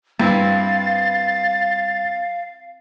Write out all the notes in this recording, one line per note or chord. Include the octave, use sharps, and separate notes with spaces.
G2 C4 E4 F5 A6